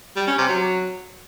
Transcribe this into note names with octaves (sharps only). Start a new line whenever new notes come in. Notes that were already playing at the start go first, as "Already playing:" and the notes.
G3
C#4
C3
F#3